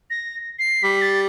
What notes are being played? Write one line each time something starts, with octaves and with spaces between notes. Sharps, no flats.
A#6
C7
G3 B6
A6